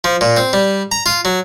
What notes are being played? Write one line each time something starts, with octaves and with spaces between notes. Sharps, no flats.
F3
A#2
C4
G3
A#5
F4
F#3